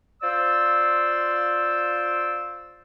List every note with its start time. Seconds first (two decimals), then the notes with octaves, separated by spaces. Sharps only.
0.22 F4 C5 D5 E6